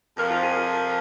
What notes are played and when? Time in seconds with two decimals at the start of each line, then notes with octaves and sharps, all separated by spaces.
0.16 F2 C3 F3 A#4
0.29 F4
0.41 G#4
0.54 A#4